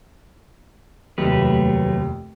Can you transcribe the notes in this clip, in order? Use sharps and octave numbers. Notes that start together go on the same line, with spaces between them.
F1 D#2 F#3 A3 B4